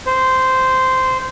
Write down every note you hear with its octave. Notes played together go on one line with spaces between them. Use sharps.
C5